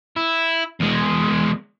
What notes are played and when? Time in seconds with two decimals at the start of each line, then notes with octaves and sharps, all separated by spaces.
0.17 E4
0.80 E2 G#3